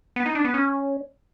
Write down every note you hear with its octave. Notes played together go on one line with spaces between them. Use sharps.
B3
D#4
D4
B3
C#4